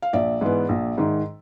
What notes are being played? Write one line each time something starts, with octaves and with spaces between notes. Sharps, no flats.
F5
A#1 D5 E5
G#2 E3 G#3 B3
A#1
G#2 D#3